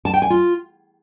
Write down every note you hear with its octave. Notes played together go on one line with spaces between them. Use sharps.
A5
G5
G#5
F4